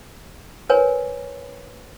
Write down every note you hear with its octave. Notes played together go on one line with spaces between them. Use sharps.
A#4 B4 C#5 G#5